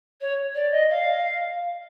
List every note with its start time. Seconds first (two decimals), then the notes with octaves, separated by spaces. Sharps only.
0.21 C#5
0.55 D5
0.71 D#5
0.90 F5